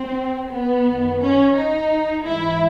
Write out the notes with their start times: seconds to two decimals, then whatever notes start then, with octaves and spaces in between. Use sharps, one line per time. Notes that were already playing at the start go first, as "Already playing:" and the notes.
Already playing: C4
0.51 B3
0.86 F#2 D#3
1.21 C#4
1.55 D#4
2.25 G#2 E3 E4